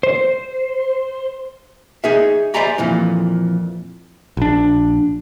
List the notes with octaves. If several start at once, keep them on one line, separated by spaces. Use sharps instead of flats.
C5
D#4 G#4 E5
C5 D5 E5 G#5 A#5 B5
F2 A#2 E3
A#1 D4